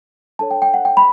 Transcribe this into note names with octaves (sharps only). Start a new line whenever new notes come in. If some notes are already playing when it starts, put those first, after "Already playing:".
D4 A4 C#5 A5
G5
G5
F#5
G5
B5